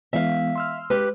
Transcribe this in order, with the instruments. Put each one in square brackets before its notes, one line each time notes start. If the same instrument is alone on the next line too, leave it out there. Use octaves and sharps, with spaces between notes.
[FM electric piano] E3 G#3 B3 [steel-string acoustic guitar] E5 F5
[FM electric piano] C6 E6 F6
[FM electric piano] G#3 [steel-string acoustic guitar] G4 B4